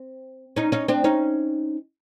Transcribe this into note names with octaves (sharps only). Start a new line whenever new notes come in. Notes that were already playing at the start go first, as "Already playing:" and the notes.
Already playing: C4
C#4 D#4
C#4 D#4
C4 D4
C#4 D#4